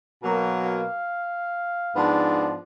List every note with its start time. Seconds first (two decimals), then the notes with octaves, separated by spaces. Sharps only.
0.23 B2 F#3 A#3
0.67 F5
1.96 G#2 F3 B3 D4